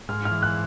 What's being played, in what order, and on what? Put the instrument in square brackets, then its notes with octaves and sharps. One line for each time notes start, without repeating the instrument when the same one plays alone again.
[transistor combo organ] G#2 [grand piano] F6
[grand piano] F6
[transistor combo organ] E3
[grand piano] F#6